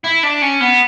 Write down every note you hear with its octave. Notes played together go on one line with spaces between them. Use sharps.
E4
D4
C#4
B3